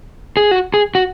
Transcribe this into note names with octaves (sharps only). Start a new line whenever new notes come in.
G#4
F#4
G#4
F#4